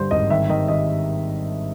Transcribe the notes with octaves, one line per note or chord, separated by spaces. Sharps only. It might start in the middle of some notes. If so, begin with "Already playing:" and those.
Already playing: G2 D3 C5
G#1 D#5
D#3 E5
D#3 D#5
D#3 D#5